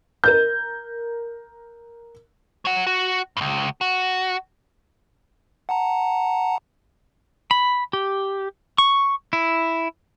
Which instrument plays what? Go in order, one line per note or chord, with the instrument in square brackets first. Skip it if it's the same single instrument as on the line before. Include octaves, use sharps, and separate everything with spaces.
[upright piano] A#4 G6
[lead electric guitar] F#3 F#5
F#4
C#2 G2
F#4
[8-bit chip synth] F#5 A5 A#5
[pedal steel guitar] B5
G4
C#6
E4